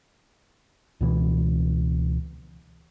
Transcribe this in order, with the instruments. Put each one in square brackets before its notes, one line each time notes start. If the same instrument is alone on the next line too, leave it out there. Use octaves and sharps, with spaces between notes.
[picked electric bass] C#2 B2 E3